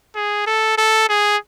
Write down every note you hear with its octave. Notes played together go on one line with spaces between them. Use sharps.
G#4
A4
A4
G#4